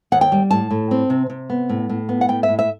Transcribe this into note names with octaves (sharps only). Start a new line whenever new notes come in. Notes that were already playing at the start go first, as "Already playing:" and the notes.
D#2 F#5
G5
G3
A2 A5
A2
C4
C3
C3
B3
A2
A2
B3
F#5
A2 G5
A2 E5
E5